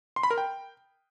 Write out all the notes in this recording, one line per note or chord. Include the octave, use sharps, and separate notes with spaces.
C6
B5
A#4
G5